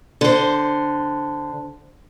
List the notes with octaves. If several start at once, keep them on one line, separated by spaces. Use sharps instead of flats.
D3 C5